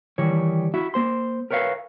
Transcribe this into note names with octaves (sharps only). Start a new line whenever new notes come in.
D#3 E3 G3 C#5
E4 F#4 E5
A#3 C5 C6
A#4 B4 C#5 E5 F5